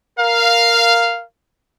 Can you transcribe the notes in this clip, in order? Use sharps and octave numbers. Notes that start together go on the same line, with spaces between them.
A#4 F5